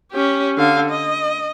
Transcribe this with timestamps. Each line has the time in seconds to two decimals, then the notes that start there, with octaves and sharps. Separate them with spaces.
0.12 C#4 G4
0.58 D3 F5
0.90 D#5